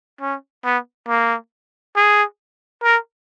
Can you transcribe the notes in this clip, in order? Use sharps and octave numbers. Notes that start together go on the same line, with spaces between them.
C#4
B3
A#3
G#4
A#4